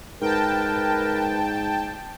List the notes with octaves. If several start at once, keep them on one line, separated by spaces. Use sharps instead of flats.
G#2 A#4 B4 G5 A5